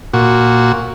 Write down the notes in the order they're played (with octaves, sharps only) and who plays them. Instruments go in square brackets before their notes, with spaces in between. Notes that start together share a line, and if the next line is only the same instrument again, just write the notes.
[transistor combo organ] A#2 F#4